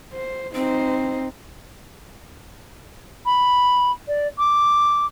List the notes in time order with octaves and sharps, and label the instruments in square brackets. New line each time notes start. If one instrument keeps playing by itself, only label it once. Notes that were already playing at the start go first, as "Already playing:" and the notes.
[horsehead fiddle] C5
[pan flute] C4 [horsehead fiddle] D#4 C5
[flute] B5
D5
D6